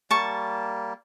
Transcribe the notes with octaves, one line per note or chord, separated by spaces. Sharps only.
G3 A#3 A5 C#6